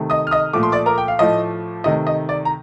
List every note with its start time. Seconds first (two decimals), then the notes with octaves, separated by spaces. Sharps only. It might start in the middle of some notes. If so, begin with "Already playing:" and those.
Already playing: C3 D#3 A3
0.10 D#5 D#6
0.27 F6
0.31 D#5 D#6
0.53 A#2 F3 A3 D6
0.63 C6
0.72 D5 D6
0.86 A#4 A#5
0.98 G5
1.08 F5
1.19 A2 F3 A3 D#5
1.84 C3 D#3 A3 D#5
2.07 D#5
2.29 D5
2.45 A#5